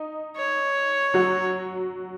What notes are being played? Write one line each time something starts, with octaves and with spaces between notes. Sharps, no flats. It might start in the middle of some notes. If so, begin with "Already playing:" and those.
Already playing: D#4
C#5
F#3 F#4